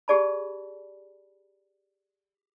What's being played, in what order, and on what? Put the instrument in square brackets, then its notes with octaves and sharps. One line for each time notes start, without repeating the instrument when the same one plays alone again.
[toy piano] G4 G#4 D5 A5 B5